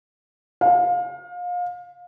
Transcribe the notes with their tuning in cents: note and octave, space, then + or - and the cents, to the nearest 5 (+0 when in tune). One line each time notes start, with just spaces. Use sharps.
F5 +30